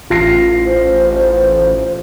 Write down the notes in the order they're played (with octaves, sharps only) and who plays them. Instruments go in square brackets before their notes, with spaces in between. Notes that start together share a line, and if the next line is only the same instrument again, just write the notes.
[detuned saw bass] A1 [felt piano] F4 A#6 C7
[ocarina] C5